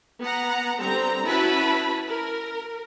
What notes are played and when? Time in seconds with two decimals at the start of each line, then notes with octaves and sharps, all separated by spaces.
0.22 B3 F#5 A#5
0.79 D3 G3 C4 A#5
1.27 C#4 E4 F#4 B4 A5 B5
2.09 A#4